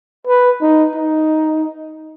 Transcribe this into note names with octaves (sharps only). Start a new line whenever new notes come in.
B4
D#4
D#4